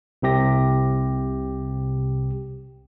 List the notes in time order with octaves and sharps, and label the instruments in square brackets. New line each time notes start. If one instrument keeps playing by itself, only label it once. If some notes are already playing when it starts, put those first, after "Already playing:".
[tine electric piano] C2 C3 G4 A#6